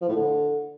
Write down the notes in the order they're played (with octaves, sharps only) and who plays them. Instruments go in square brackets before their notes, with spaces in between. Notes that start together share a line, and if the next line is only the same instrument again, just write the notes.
[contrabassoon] F3
A2
D3